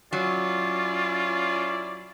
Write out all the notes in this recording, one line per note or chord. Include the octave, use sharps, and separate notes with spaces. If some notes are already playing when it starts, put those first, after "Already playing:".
F#3 C#4 E4 F4 D5